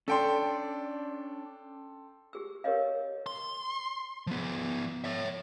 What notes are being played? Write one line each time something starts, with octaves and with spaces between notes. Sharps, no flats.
C#4 D4 A4 D5 G5 C6
G4 G#4 E6
G4 A#4 B4 C#5 D#5 F5
C6
F3 B3
C#5 E5